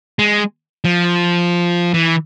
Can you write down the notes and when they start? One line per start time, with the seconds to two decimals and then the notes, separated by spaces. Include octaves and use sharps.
0.19 G#3
0.84 F3
1.94 E3